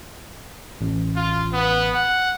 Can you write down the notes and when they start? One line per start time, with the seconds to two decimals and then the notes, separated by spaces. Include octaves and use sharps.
0.81 A1
1.16 F4
1.53 B3
1.94 F#5